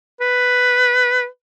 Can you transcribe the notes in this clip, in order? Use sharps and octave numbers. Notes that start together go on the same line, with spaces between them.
B4